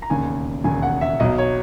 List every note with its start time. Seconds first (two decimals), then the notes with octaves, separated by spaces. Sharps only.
0.02 A#5
0.10 E1 D#2 C#3 G#5
0.64 E1 D#2 C#3 G#5
0.82 F#5
1.01 E5
1.20 B1 B2 F#3 D#5
1.38 C#5